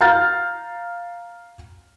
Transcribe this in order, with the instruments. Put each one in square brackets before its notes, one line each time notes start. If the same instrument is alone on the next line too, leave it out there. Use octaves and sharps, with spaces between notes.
[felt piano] F5 A#5 F6 G6 A6